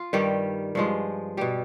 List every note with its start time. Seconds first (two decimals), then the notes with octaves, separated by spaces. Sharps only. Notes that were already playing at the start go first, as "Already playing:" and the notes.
Already playing: F4
0.13 G2 D#3 G3 G4
0.75 G2 F3 G#3
1.37 B2 G3 G4